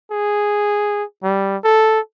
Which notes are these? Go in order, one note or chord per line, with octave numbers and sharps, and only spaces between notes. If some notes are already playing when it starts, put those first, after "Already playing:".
G#4
G3
A4